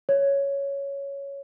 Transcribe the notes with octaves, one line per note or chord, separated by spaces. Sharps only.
C#5